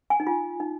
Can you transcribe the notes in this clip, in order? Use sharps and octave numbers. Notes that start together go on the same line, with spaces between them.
G#5
D#4
F4
D#4